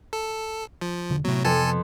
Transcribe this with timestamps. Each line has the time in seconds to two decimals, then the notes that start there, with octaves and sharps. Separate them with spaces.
0.13 A4
0.81 F3
1.10 E1 D3
1.24 A2 C3 F#3 B3
1.45 F2 A4 G#5 A5